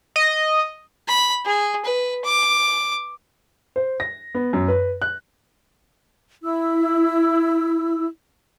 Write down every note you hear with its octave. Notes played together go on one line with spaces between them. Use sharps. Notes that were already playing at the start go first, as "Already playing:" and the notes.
D#5
B5
G#4
B4
D6
C5
A#6
B3
F#2
B4
F#6
E4 E6